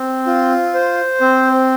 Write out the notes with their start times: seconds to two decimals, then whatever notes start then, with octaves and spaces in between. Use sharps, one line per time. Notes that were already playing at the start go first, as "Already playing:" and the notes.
Already playing: C4
0.26 F4
0.74 C5
1.21 C4